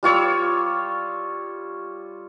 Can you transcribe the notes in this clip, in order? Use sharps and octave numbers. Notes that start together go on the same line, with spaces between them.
G3 F4 C#5 E6